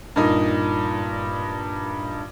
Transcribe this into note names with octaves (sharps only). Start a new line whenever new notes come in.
G2 A#2 D#4